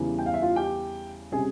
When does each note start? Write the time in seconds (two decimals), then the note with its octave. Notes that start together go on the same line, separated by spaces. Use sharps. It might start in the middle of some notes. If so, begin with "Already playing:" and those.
Already playing: E2 C#3 E3 G3
0.19 G5
0.26 F5
0.34 E5
0.42 F4 F5
0.56 G4 G5
1.32 C3 G3 C#4 G#4 G#5